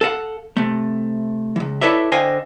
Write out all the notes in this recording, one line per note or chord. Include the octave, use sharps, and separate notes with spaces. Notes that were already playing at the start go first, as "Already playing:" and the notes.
A4 F5 F#5
C3 A3
C#2 E3
E4 A4 B4 C#5 D5 E5
D3 C5 D#5 F5 G5 G#5